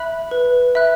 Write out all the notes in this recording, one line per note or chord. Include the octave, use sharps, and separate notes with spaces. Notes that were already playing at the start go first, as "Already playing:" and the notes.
Already playing: E5 B5 F#6
B4
E5 B5 F#6